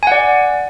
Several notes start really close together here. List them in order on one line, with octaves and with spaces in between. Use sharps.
G#5 F#5 D5